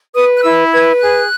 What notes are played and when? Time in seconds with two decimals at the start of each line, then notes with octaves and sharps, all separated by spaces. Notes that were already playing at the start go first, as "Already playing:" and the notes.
0.15 B4 D#6
0.37 F#6
0.43 E4 E6
0.72 B4 G#6
1.01 G#4 F#6